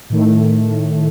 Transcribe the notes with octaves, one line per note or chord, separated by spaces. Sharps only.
A2 D#3 A3